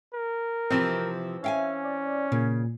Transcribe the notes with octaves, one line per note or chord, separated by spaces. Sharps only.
A#4
C3 E3 F3 C4 G4
C#4 E5 F5 G5 G#5
D5
A#2 C#3